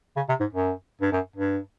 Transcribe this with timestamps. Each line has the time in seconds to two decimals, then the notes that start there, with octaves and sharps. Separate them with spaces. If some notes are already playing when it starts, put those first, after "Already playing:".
0.17 C#3
0.29 C3
0.40 G#2
0.53 F#2
1.01 G2
1.13 F#2
1.36 G2